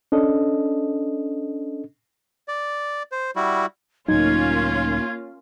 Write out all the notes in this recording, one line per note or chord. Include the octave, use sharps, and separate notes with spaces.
C#4 D4 A4 D#5
D5
C5
G3 E4 F#4
C#2 A2 F#3 A#3 C#4 D#4 F4 G#6